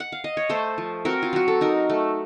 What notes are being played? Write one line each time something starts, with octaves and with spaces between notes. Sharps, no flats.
F#5
F5
D#5
C#5
A3 A4 C5
F3
C4 F#4 A#4
F4
F#3 F#4
A4
D#4 F#4 A#4
A3